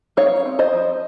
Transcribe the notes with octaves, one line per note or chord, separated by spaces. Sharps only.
D#4 C#5 F5
C4
C5 D#5
F3